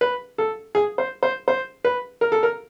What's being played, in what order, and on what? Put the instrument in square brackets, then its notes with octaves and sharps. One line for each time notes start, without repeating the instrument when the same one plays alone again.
[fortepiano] B4
A4
G#4
C5
C5
C5
B4
A#4
A4
A#4